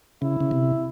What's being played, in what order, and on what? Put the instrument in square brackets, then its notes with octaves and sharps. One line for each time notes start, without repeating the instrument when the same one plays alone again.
[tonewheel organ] C#3 [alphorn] E4
[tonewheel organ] C#3
C3